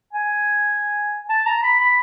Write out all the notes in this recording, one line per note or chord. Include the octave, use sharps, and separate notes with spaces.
G#5
A5
A#5
B5
B5